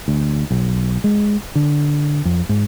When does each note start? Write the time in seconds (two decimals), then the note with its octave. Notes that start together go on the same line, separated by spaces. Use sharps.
0.08 D2
0.50 B1
1.04 G#3
1.55 D3
2.25 F2
2.49 G#2